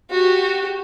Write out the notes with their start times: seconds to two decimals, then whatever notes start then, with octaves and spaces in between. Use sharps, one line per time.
0.11 F#4 G4